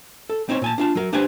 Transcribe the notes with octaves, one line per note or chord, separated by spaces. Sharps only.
A4
C4 D#4 C5 C#5
A#2 G#5 A5
D4 F4 A5
F#3 A#4
D4 G4 B4 C5 G#5